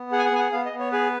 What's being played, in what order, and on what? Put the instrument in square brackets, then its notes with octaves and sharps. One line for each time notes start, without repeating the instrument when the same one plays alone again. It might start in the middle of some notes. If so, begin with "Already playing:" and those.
Already playing: [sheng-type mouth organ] B3
G#4 F#5
G#5
F#5
B3 G#5
F#5
B3 F5
D#5
B3
C#5
G#4 B4